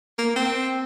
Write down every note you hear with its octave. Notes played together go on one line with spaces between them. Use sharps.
A#3
C4